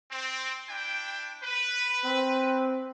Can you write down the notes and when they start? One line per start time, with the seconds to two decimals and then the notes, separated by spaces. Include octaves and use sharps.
0.11 C4
0.69 D4 E4 G5
1.42 B4
2.05 C4